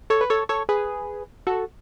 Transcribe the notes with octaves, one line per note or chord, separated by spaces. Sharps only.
A4 C#5
B4
A4 C#5
A4 C#5
G#4 B4
F#4 A4